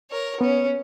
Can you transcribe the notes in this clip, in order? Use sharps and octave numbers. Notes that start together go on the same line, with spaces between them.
A#4 C#5
B3 C#4